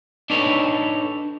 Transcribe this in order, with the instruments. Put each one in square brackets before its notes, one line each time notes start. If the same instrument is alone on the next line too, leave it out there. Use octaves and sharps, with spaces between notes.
[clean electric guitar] D4 D#4 A4 B4 C#5